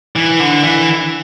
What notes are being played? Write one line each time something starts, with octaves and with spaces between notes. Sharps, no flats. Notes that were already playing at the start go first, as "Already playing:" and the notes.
E3
D3
E3